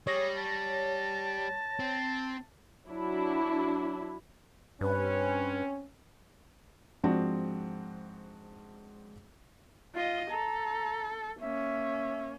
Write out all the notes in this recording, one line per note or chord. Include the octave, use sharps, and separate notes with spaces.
G3 G#4 C#5 A#6
A5
C4
F#3 D4 E4
G2 C4 C#4 B4
G#2 F3 C4 D4 F#4
F4 D#5
A4 A#5
A#3 C#4 E5